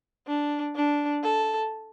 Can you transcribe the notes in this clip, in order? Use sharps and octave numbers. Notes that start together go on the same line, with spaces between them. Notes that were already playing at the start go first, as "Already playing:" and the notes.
D4
D4
A4